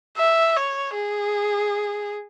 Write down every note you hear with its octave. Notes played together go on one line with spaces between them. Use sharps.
E5
C#5
G#4